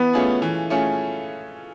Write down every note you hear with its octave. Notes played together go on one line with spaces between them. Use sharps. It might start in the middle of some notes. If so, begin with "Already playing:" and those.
Already playing: E3 B3
A3 C#4 F4 G#4
E3
A3 C#4 F4 G#4